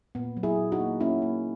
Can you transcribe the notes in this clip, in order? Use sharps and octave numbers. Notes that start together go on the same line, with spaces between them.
A#2 B3
F#3
E4 G#4
A#2
D#4 F#4
A#3
A#3 C#4 E4
A#3